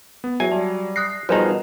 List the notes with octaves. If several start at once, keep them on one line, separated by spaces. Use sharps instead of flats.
B3
E2 F#3 E5 G#5
G3 A5
D#6 F#6 A#6 C7
B2 F3 G3 D#4 G#4 A#4 G#5 A5